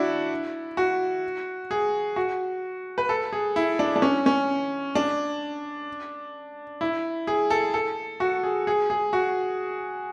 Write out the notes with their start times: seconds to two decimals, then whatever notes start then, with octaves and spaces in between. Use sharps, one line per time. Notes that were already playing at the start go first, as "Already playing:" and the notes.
Already playing: D4 E4 F#4
0.77 F#4
1.71 G#4
2.16 F#4
2.98 B4
3.09 A4
3.33 G#4
3.56 E4
3.79 D4
3.96 D4
4.02 C#4
4.26 C#4
4.95 D4
6.81 E4
7.27 G#4
7.50 A4
7.74 A4
8.20 F#4
8.43 G#4
8.67 G#4
8.90 G#4
9.13 F#4